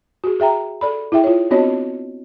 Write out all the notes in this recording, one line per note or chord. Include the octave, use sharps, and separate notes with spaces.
F#4 G#4
G#4 E5 G5 A#5
A4 D5 B5
E4 G#4 E5 G5
F4 C#5
B3 C4 D4 F#4 C#5 D#5